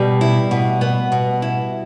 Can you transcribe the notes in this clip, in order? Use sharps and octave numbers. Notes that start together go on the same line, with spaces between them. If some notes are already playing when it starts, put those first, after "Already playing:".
Already playing: B2 G3
E4
B2
B3
B2
E4